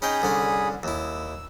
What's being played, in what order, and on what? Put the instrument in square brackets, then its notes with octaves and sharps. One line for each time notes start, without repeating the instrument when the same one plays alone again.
[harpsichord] C#4 D#4 G5 [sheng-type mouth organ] G#4 B5 D#6
[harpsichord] C2 D3 C#4
[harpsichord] D#2 E4 [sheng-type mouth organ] E6